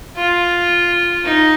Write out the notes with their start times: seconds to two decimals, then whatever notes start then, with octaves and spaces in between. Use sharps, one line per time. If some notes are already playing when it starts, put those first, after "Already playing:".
0.17 F4
1.24 D#4